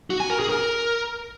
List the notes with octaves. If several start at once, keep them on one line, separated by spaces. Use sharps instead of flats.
F#4
G#5
A#4
G#4
A#4